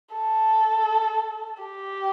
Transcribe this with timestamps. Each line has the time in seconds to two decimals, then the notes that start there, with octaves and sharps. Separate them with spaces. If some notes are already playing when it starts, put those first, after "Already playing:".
0.15 A4
1.63 G4